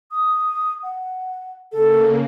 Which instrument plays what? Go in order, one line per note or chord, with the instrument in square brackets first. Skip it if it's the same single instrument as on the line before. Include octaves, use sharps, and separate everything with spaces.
[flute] D#6
F#5
[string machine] C#3 A#3 [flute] A4